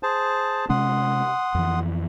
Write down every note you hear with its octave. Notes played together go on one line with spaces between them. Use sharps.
G#4 C5 A5
C3 G#3 C#4 F#5 C6 D#6
F2 E3